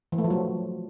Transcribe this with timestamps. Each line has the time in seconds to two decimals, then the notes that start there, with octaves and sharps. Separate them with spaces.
0.12 E3
0.18 A3
0.24 F3
0.30 F#3